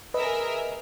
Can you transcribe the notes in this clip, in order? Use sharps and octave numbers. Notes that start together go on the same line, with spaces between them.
G#4 A#4 B4 D#5 E5